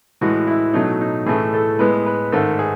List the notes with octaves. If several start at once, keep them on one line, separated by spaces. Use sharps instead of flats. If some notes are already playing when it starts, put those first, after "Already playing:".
A2 E3 G#3 F#4
E4
B2 F#3 A3 D#4
D#4
A2 E3 A3 G#4
A4
A2 G#3 B3 B4
B4
G#2 D#3 A3 A4
G#4